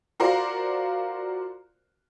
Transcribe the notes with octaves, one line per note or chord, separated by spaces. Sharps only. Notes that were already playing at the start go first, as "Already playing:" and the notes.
F4 F#4 A#4 C5 D5